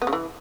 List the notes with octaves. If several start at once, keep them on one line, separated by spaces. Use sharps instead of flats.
B3
C#3
E3